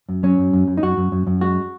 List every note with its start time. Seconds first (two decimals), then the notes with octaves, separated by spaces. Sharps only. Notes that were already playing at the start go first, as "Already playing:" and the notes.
0.09 F#2
0.23 F#3 C#4
0.38 F#2
0.53 F#2
0.67 F#2
0.77 D#4
0.83 F#2 F#4
0.97 F#2
1.12 F#2
1.27 F#2
1.41 G#3 F#4